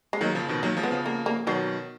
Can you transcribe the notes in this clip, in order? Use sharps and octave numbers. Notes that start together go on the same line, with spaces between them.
G#3
D#3 F#3 A#3
C#3 F3
B2 D#3
D#3 F#3 A#3
F3 G#3
B3
C#3 F3
A#3
A#3
B2 D#3 F#3